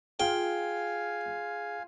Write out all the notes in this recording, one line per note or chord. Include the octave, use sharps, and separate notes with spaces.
F4 G#4 F5 G5 G#5